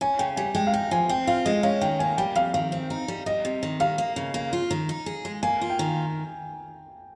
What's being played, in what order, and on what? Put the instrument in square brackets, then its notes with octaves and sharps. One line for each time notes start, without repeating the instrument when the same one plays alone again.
[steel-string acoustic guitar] C#4 [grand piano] G#5
[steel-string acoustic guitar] C#3 [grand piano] G5
[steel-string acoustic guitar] G3 [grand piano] G#5
[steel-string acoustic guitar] G#3 [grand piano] G5
[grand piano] F5
[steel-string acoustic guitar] D#4 [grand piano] G5
[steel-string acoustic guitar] F3 [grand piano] G#5
[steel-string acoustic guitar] C4 [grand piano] G5
[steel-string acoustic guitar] F4 [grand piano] F5
[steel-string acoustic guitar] G#3 [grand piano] D#5
[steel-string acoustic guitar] C#4 [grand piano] F5
[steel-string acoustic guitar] D#3 [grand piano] G5
[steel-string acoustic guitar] A#3 [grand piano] G#5
[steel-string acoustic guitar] G3 [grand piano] G5
[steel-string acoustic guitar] F2 [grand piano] F5
[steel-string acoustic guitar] D#3 [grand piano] F5
[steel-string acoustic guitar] C4
D#4
G3
[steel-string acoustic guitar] G3 [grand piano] D#5
[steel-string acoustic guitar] C3
D#3
[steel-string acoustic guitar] G3 [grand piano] F5
[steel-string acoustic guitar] A#3
C#3
A#3
F4
D#3
D#4
G#4
G#3
[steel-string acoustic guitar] A#3 [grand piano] G#5
[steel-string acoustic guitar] F4
[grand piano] G5
[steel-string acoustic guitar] D#3